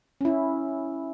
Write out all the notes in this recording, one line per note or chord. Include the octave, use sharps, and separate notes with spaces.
C#4 E4